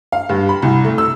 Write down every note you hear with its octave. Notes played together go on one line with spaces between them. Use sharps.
F5
G2
B5
C2
A3
E6